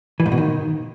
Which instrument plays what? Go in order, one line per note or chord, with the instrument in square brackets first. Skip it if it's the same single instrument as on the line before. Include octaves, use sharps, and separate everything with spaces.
[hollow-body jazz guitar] E3
G#2
B2
D#3